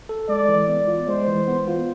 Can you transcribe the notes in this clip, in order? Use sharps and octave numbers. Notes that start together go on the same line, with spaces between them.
A4
G#3 D5
E3
B3
F4
G#3 C5
E3
B3
F4